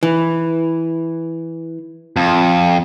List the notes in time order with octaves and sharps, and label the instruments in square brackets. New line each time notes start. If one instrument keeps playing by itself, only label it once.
[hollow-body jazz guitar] E3
[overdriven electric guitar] F2